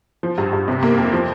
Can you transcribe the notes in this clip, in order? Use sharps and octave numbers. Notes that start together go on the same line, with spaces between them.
F3
G2
G2
C3
A#3
F2
F3